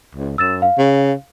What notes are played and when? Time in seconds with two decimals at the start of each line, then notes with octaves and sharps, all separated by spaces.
0.15 C#2
0.38 F#2 E6 A6 E7
0.62 F5
0.78 C#3